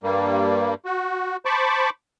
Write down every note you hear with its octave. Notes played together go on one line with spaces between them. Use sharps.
G2 G3 A#3
F#4
C5 A5 B5 C#6 D6